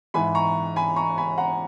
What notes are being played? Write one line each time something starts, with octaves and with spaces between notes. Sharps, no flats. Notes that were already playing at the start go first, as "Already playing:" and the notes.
G#2 E3 G#5 B5
A#5 C#6
G#5 B5
A#5 C#6
G#5 B5
F#5 A#5